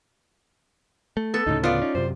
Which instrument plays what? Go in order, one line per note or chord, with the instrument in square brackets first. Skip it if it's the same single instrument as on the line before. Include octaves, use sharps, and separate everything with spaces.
[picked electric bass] A3
[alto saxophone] B3 [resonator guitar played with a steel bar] A4
[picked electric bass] D2 A2 C#3 [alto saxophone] D#4
[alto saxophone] B3 [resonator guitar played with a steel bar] F4 D5
[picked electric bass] C#4 [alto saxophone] D#4
[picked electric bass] F#2 C3 [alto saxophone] C5